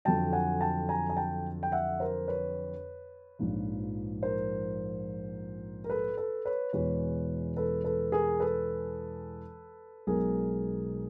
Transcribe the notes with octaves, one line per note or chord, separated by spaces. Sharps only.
F2 D3 F#3 G5 A5
F#5 G#5
G5 A5
G#5 A#5
G#5
G5 A5
G5
E5 F#5
A#4 C5
B4 C#5
A#1 G#2 F3
A#4 C5
A#4
A4 B4
A4 B4
B4 C#5
E2 B2 G#3 B4 C#5
A4 B4
A4 B4
G#4 A#4
A4 B4
B1 B2 G#3 G#4 A#4